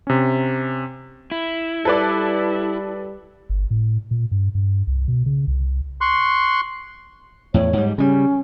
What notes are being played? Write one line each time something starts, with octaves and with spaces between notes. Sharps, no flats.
C3 C#4
E4
G3 A4 B4 D5
G1
A2
A#2
G2
G2
C2
B2
C#3
C2
C6 C#6 F#6
E2 A2 C#5
G#2 G3
C#3 G3 C#4